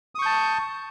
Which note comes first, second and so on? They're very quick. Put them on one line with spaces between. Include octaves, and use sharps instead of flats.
D#6 C#6 G6 A5